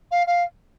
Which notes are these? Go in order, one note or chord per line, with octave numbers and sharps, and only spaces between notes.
F5
F5